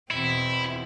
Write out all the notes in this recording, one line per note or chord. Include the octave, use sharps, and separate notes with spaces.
E2 B2 C4 E4